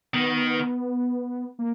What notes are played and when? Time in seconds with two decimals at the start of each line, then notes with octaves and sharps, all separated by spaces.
0.14 D#3 B3
1.59 A#3